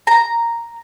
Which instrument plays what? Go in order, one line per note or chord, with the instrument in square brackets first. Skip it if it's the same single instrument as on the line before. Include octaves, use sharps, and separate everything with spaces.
[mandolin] A#5